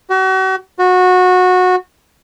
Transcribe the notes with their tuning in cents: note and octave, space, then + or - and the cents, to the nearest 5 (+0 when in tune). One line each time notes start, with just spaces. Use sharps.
F#4 +40
F#4 -20